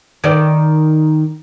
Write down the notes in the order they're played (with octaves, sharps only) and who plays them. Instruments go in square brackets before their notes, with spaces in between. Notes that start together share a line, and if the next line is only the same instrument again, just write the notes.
[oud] D#3 D5